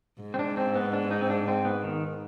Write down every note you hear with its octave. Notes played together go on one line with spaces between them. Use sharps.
G#2
C4
D4
C4
B3
D4
D#4
C4
D4
C4
B3
D#3